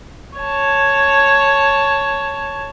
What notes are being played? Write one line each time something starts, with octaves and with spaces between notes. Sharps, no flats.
C#5 A5